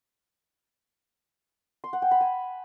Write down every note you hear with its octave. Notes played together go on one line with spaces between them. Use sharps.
C6
F#5
G5
B5
G#5